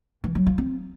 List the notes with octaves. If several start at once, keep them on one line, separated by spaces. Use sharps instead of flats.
E3
F#3
F4
C4